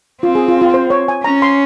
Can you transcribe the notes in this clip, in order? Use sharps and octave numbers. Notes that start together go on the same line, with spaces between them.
C4 F4
G#4
F4
F4
C5
C#5
G#5
C#4 A#5
C6